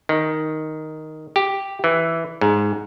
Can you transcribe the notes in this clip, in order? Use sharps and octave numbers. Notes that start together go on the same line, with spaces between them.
D#3
G4
E3
G#2